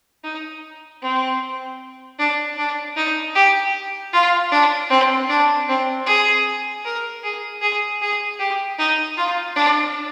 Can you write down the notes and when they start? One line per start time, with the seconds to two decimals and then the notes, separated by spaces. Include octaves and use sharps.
0.24 D#4
1.02 C4
2.19 D4
2.58 D4
2.96 D#4
3.35 G4
4.13 F4
4.51 D4
4.90 C4
5.29 D4
5.68 C4
6.06 G#4
6.85 A#4
7.23 G#4
7.62 G#4
8.01 G#4
8.39 G4
8.78 D#4
9.17 F4
9.56 D4